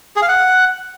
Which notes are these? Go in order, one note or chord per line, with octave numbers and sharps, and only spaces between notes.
G#4
F5
F#5